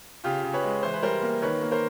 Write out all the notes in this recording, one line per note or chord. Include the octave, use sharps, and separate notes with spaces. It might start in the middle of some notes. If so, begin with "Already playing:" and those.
C#3 F4 G4
C#3
B4 C#5
G#3
E3 C5
B4
G3 A#4 C5
A#3
D#3 B4 C#5
A#3
A#4 C5